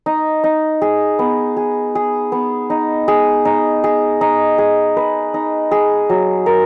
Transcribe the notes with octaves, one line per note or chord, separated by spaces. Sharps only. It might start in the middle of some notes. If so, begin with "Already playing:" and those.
D#4
D#4
G#4
B3
G#4
G#4
B3
D#4
G#4
D#4
G#4
D#4
G#4
B4
D#4
G#4
F#3
A#4